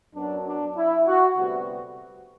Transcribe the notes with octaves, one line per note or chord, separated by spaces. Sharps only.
F#2 F#3 B3 D4
D4
E4
F#4
D2 C3 G3 B3 F#4